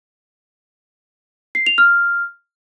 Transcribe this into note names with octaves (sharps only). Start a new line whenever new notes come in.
C7
F7
F6